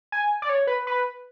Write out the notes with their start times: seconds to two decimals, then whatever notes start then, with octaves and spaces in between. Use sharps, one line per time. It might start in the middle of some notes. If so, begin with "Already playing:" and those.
0.12 G#5
0.42 D5
0.49 C#5
0.67 B4
0.87 B4